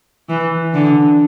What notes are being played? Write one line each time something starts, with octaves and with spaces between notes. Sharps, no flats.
E3
D3